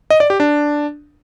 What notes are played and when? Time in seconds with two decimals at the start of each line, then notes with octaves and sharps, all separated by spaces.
0.10 D#5
0.20 D5
0.30 G4
0.40 D4